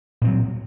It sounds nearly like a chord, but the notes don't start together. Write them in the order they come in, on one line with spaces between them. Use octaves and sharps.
A#2 C4 F#3